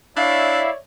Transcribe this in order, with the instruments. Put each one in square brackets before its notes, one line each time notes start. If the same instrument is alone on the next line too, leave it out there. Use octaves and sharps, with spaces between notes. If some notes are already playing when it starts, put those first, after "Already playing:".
[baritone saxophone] D4 [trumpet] E4 [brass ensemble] C#5 D5 E5 [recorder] F5